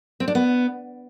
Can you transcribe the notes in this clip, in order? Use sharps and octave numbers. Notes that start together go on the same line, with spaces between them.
C4
D4
B3